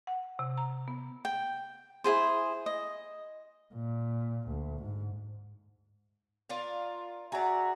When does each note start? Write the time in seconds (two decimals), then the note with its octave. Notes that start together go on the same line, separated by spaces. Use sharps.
0.07 F#5
0.39 C3
0.57 A#5
0.88 B3
1.25 G5
2.04 E4 F4 G#4 C5
2.66 D#5
3.74 A#2
4.47 D2
4.82 G#2
6.49 D4 F4 A#4
7.32 F#4 G#4 D5 E5 A#5